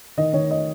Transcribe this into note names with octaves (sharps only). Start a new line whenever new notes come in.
D#3 D#5
D#3 C#5
D#5